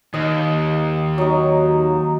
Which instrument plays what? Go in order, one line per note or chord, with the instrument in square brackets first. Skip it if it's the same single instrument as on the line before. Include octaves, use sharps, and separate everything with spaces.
[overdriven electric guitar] D#2 [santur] D#5
[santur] F#3 D#4